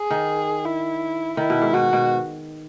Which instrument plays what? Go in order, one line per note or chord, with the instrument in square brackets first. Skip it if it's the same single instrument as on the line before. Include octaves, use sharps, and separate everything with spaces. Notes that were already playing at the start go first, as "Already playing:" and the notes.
Already playing: [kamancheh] G#4
[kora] D#3
[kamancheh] E4
[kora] D#3 [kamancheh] E4
[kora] B2
G#2
[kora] B2 [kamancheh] F#4
[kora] B2